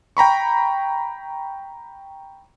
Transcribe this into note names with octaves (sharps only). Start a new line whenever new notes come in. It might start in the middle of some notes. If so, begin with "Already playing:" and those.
G5 A#5 B5 C#6